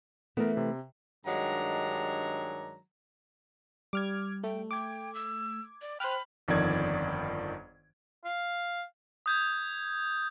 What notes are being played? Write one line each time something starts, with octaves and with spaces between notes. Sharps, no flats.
E3 A3 B3 A#4
C3
G2 D#3 F#3 G#3 D4 A#5
G3 D6 F6 G#6
A3 G5
G5 D6 G#6
E6
D5
C5 G5 B5 F6 F#6
G1 F2 D#3 F3 D5 G#6
F5
D#6 G6 G#6